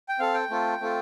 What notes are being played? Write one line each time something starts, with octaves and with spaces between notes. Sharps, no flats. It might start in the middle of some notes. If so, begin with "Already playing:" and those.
G5
C4 A4 F5
G5
A3 C4 F4 A4
A3 C4 F4 A4